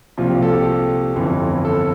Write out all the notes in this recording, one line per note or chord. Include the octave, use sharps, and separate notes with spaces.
C2 A#2 F3 F4
G4
A4
G4
G1 F2 E3
A4